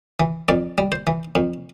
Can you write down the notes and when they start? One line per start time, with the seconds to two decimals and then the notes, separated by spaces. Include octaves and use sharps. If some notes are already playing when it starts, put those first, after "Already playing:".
0.20 E3
0.48 F2 D5
0.78 G3
0.92 C5
1.07 E3
1.35 F2